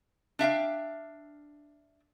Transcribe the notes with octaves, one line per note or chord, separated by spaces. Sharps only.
D4 E5 F5 G5